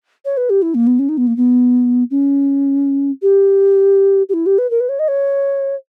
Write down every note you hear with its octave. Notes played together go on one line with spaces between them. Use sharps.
C#5
B4
G4
E4
A#3
B3
C#4
D#4
B3
A#3
B3
C#4
G4
G4
E4
G4
B4
A#4
B4
C#5
D#5
C#5